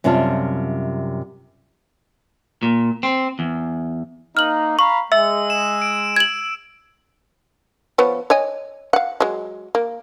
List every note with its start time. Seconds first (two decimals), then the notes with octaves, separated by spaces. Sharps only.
0.04 F#2 C3 G3 F4 A5
2.63 A#2
3.03 C4
3.39 E2
4.37 A#3 D#4 F6 F#7
4.79 F5 A#5 B5 C#6
5.12 G#3 E5 E6
5.50 E7
5.82 D7
6.16 G#6 F#7
7.98 F3 B3 C#5
8.30 C#5 D#5 G#5
8.93 F5 F#5
9.20 F#3 G#3
9.75 A#3